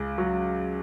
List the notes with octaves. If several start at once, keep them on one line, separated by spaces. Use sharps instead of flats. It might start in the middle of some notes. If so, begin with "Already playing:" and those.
Already playing: C#2 C#3
F#3